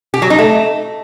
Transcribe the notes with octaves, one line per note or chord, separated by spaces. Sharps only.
G4
F#3
D#4
A3